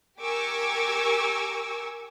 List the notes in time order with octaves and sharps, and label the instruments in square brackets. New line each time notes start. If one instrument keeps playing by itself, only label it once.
[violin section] G4 A#4 G#5 C#6 D6 E6